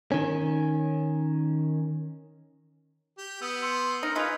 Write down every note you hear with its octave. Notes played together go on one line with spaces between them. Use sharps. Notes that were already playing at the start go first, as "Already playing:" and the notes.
D#3 C#4
G4
B3 D#6 E6 G6
C6 E6 C#7 F7
D#4 A#4
G#3 D#4 F4 B4 G#6 F7